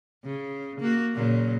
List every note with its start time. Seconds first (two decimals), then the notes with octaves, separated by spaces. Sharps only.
0.24 C#3
0.80 A#3 F#4
1.15 A#2 C#3 F#3